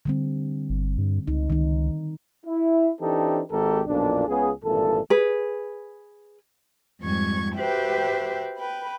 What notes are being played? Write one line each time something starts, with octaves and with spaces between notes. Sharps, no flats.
D3 G3 C4
G1
G2
C#2 D#4
C#2 D#3 D#4
E4
E3 C4 D4 D#4 G4 A4
G#1 G#2 D#3 G4 A4 A#4
B1 F2 A#2 D4
C#2 C#3 B3 G#4
G#1 G2 A#2 E3 A4
G#4 B4
F2 G#2 G3 C#6 G#6
F#4 G4 B4 C5 E5 G5
B4 G5 B5